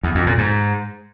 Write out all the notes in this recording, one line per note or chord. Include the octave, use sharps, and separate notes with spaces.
E2
F2
A#2
G#2